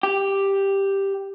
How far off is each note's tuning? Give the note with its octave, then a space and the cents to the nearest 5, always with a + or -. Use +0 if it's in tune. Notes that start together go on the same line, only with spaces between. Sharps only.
G4 +5